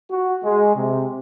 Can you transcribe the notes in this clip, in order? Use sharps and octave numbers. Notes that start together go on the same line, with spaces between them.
F#4
G#3
C3